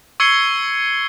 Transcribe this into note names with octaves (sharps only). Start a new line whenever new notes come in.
C#6 E6 G#6 C7 C#7 G7